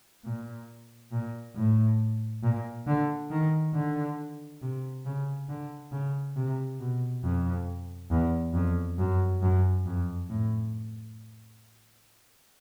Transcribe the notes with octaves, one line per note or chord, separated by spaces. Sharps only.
A#2
A#2
A2
A#2
D3
D#3
D3
C3
C#3
D3
C#3
C3
B2
F2
E2
F2
F#2
F#2
F2
A2